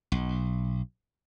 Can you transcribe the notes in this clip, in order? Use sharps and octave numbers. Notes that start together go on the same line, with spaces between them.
B1